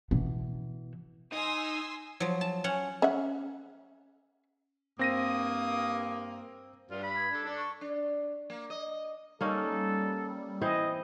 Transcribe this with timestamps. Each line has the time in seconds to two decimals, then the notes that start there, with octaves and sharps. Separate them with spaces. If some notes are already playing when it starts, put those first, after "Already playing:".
0.11 B2 E3
1.32 D#4 G#5 C6 D#6 E6
2.20 F3 F#3
2.41 A5
2.64 C#4 F#5
3.02 C#4 E5 F#5
4.99 G2 A#3 C4 D#6 A#6 D#7
6.90 G2 F4 D5
7.03 B5
7.16 G#6
7.32 D4 A4
7.45 D4 A4
7.58 C#6
7.81 D4
8.50 A#3
8.70 D#5
9.41 G3 A#3 C#4 D#4 A4
10.62 E3 C4 C5 D#5